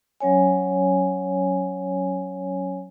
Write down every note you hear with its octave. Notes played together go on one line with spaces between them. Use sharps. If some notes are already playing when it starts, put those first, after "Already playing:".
F#3 C#4 C#5 G#5